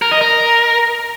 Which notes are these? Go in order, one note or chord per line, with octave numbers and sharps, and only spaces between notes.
A#4
D#5
A#4